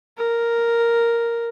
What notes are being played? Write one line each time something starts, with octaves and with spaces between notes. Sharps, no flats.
A#4